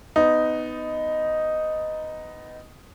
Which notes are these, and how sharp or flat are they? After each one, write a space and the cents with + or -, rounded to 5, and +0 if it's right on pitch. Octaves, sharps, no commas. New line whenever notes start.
B3 +20 D#4 +0